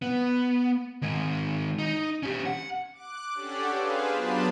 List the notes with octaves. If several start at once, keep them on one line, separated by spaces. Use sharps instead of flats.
B3
D#3 G#3
D#4
C#4 G4
F#5
D6 F#6
C#4 D4 G4 A4 D5 F#5
G#4 B4 C5 F5
F#3 B3 D4 F4 A5 B5